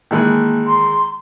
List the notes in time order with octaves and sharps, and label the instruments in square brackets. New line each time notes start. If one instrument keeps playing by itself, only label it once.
[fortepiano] D#3 E3 G#3 [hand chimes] A#3 A5 F#6
[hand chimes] A#5 [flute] C6